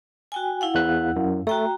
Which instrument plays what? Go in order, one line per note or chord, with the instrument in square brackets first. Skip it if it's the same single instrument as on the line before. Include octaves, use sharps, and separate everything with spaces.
[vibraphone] F#4 G5 G#5
E4 F5 F#5
[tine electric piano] E2 E3 F#6
F#2
[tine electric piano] A3 [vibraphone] F#4 G5 A#5